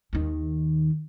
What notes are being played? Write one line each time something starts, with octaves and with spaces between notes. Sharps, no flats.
D#2 D#3